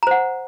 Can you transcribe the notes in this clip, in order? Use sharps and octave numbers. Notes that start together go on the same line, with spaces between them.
C5 F#5 A#5